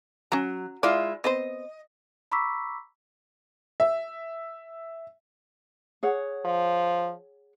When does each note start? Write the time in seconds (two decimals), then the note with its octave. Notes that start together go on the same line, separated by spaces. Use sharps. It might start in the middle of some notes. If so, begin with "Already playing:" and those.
0.32 F#3 C#4 A#5
0.83 G#3 E4 F4 D5
1.24 B3 C4 C5 D#5
2.32 A#5 B5 C#6 D6 E6 B6
3.80 E5
6.03 G#4 C#5 F#5
6.45 F3